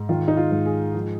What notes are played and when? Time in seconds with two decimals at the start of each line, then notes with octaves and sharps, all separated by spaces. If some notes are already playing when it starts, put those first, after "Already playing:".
Already playing: G#2
0.09 D#3 F4
0.28 D#4
0.37 F4
0.52 G#2
0.66 G#4
0.94 F3